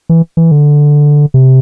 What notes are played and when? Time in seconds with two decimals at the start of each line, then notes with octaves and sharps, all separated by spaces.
0.09 E3
0.37 E3
0.51 D3
1.34 C3